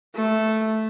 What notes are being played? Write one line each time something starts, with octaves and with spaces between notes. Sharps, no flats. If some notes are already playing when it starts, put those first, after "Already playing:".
A3